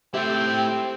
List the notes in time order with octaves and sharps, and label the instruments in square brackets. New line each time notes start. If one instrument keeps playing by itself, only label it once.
[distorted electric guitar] A3 E4 [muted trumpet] C4 [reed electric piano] G4 E5 [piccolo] G5